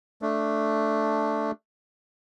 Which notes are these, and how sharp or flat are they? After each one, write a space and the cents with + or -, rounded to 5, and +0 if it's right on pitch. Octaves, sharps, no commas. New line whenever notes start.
A3 +0 D4 +0